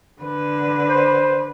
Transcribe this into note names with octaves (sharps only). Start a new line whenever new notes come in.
D3 B4
C5